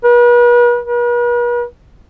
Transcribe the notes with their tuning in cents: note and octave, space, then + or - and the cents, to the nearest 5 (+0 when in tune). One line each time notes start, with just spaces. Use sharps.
B4 -40
B4 -45